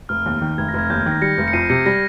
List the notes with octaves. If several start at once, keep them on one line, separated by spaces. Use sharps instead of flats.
F1 F6
D#2
D#3
F1 G#6
A#6
F1 G#6
D#2 G6
G#6
D#3
A#6
G3 A#6 C#7
F1
C#7
F2 C7 D#7
C3 A#6 C#7
G3 A#6